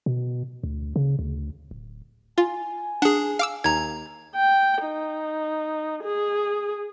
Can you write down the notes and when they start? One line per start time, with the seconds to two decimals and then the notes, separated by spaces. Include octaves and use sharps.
0.06 B2
0.63 D2
0.96 C#3
1.19 D2
1.71 D1
2.38 F4 G#5
3.02 D4 G#4 F#5
3.39 F5 D6 E6
3.64 D#2 A#5 G#6
4.35 G5
4.84 D#4
6.03 G#4